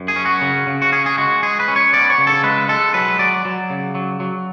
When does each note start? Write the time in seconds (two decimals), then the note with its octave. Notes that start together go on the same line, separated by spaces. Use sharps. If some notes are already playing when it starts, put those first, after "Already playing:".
Already playing: F#2
0.08 G#4
0.16 C#4
0.25 F#4
0.41 C#3
0.67 C#3
0.82 F#4
0.92 C#4 G#4
1.06 G#4
1.18 G#3 F#4
1.42 G#3 G#4
1.60 B4
1.68 C#4
1.76 C#5
1.93 B3 D5
2.10 C#5
2.18 C#3
2.27 A4
2.43 G#3 B4
2.69 G#3 A4
2.94 F#3 B4
3.19 F#3 D5
3.45 F#3
3.70 C#3
3.95 F#3
4.20 F#3